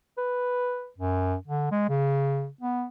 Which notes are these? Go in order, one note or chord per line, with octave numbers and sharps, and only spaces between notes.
B4
F#2
D3
G#3
C#3
B3